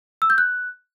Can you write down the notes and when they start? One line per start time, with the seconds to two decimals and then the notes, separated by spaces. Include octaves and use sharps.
0.22 E6
0.30 G6
0.38 F#6